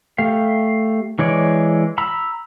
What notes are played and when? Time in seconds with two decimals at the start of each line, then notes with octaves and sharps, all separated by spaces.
0.18 A3 G4 F5
1.19 E3 G#3 C#5 D5
1.98 A#5 B5 E6